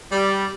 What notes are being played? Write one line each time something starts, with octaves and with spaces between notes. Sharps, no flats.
G3